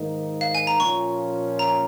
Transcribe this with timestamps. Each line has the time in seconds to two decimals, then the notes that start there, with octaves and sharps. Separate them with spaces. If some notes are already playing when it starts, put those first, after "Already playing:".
Already playing: G#2 D#3 A#3 D#4
0.41 F5
0.55 G#5
0.67 A#5
0.79 A#2 F3 C#4 F4 C#6
1.59 A#5